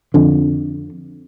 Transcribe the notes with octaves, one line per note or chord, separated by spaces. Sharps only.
F2 D3